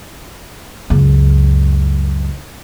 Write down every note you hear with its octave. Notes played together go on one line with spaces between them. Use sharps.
C#2 F#2